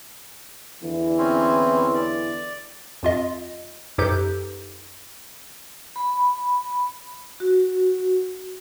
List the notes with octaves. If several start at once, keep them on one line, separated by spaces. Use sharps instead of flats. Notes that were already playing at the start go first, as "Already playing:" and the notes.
E2 D3 E3
C4 C#4
D5
F2 F4 D#5
F#2 D#4 G4 A4 B4 G6
B5
F#4